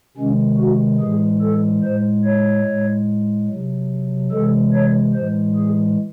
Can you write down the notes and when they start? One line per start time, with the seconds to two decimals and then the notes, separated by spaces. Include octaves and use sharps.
0.17 C3 D#3 G#3 C#4
0.59 F#4
1.00 A2 E3 G#3 G#4
1.42 A4
1.83 A2 G#3 C5
2.24 C#5
2.66 A2 G#3
3.49 C3 F#3
4.31 C3 E3 G#3 A4
4.73 C#5
5.14 A2 E3 G#3 C5
5.56 G#4